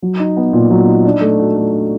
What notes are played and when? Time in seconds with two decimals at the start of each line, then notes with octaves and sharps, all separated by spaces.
0.02 F#3
0.19 D#4
0.37 B3
0.53 A#2
0.71 F#3
0.87 D#4
1.05 D4
1.21 A3
1.39 F#4
1.56 A3
1.72 D4